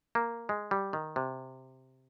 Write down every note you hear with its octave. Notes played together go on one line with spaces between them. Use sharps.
A#3
G#3
G3
D#3
C3